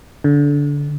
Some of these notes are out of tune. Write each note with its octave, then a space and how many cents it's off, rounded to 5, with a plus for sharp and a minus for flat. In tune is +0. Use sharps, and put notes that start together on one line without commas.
D3 -25